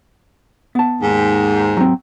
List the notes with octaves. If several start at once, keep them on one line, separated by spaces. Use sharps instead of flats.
B3 A5
D#2 G#2
F#3 C4